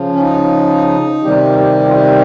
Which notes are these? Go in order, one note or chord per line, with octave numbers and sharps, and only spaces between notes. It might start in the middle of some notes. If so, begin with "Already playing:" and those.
Already playing: C#3 F3
C#4
D#4
C3 D#3 G3 G4
G4
F4
G4